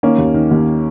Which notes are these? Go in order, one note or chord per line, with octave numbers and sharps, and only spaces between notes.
D#3 A#3 C#4
D#2
D#3
D#2